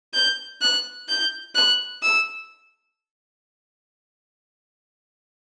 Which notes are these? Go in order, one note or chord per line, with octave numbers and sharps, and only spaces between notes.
G6
F#6
G6
F#6
E6